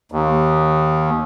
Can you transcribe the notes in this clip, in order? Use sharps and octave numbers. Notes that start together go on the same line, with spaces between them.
D#2